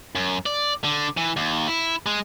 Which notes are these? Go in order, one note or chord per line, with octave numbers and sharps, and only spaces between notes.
F#2
D5
D3
E3
D#2
E4
G#3